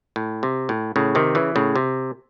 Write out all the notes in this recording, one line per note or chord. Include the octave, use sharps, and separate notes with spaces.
A2
C3
A2
A2 C#3
C3 D#3
C#3 E3
A2 C#3
C3